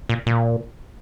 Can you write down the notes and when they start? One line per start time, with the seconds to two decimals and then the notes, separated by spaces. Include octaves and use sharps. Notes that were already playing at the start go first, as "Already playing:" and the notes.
0.09 A#2
0.26 A#2